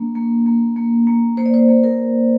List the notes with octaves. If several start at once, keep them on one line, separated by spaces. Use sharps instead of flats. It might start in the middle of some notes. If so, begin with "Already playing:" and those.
Already playing: A#3 D4
A#3
A#3
A#3
A#3
A#3 C5
D5
C5
A#3
A#4